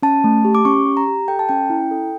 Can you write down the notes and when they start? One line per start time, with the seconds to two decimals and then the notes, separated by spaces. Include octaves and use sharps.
0.02 C#4 A5
0.24 A3
0.45 G4
0.55 D6
0.65 C#4 C#6
0.86 G4
0.97 A#5
1.08 G4
1.28 A4 G5
1.39 A5
1.49 C#4 G5
1.70 E4
1.91 A4